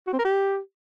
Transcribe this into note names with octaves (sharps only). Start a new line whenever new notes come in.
F#4
C4
A#4
G4